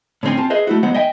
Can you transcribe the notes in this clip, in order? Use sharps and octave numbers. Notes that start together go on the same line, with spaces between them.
A2 D3 E3 C4 C#4 G#5
C4 F4 A5
G#4 B4 C5 D#5 E5
A3 E4 F#4
E2 F#3 G#3 B3 C5 F#5
D#5 E5 G5 G#5